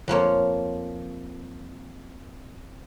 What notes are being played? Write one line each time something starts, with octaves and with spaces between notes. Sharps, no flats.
F2 F3 A#3 C#5